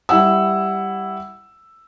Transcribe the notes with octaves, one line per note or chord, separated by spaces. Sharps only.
G3 E4 F#5 E6